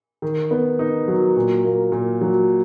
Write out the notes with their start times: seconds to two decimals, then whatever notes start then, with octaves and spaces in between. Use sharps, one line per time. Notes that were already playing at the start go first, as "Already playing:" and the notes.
0.22 D#3
0.51 B3
0.79 D#4
1.08 F#3
1.36 A#2
1.65 A#3
1.92 A#2
2.21 F#3